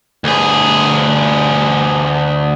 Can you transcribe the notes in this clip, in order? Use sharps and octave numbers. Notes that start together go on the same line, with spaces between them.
D2 G#4